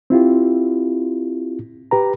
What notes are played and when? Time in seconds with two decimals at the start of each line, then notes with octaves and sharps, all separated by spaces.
0.10 C4 E4 F4 G4
1.91 G4 B4 A#5